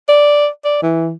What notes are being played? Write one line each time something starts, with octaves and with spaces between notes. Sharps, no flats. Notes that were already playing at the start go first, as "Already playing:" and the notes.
D5
D5
E3